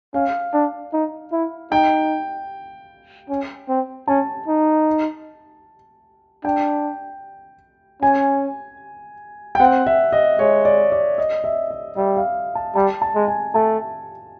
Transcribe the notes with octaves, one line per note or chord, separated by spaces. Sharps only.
C#4 F5
D4
D#4
E4
D#4 G5
C#4
C4
C#4 A5
D#4
D4 G5
C#4 G#5
G5
C4 F#5
E5
D#5
G#3 C#5
D5
D5
D#5
E5
E5
G3 E5
F5
A5
G3 A5
A5
G#3
G#5
A3 A5